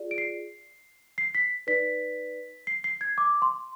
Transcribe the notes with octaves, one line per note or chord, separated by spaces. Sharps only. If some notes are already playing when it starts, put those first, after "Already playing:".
Already playing: F4 G#4 D5
D7
C7
C7
B6
D#4 B4 D5 B6
C7
C7
G#6
D6
C6